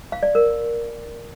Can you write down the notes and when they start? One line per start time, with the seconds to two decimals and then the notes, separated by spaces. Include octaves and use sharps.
0.12 F5
0.23 D5
0.35 A#4